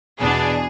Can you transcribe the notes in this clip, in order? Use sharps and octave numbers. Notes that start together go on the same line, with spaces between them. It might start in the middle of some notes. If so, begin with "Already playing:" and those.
E2 B2 B3 D4 G#4